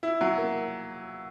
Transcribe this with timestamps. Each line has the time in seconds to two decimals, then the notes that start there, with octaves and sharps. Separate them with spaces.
0.03 E4
0.21 F#3
0.38 A#3